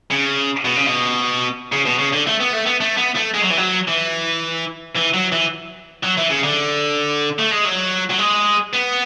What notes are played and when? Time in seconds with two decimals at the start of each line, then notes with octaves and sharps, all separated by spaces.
0.10 C#3
0.65 B2
0.76 C#3
0.86 B2
1.72 C#3
1.85 B2
1.99 C#3
2.13 D3
2.27 A3
2.40 B3
2.53 A3
2.66 B3
2.81 A3
2.97 B3
3.16 A3
3.34 G#3
3.42 F#3
3.50 E3
3.57 F#3
3.88 E3
4.96 E3
5.14 F#3
5.32 E3
6.04 F#3
6.18 E3
6.30 C#3
6.43 D3
7.39 A3
7.51 G#3
7.65 F#3
8.11 F#3
8.19 G#3
8.74 B3